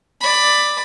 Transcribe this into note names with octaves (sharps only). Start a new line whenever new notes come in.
D5 B5